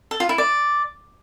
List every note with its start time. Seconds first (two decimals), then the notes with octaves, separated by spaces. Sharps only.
0.11 A4
0.20 F4
0.29 E4
0.38 D5